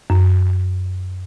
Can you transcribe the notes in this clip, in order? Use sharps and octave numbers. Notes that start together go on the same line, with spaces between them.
F#2